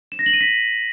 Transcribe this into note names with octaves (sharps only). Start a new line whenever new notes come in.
E7
A#6
F#7
D#7
B6